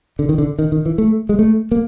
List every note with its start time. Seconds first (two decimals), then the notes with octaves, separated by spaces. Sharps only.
0.19 D3
0.29 D#3
0.38 D3
0.59 D#3
0.72 D#3
0.86 E3
0.98 A3
1.29 G#3
1.39 A3
1.71 A#3